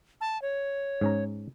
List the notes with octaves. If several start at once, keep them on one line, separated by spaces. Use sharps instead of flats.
A5
C#5
G#2 C#4 A#5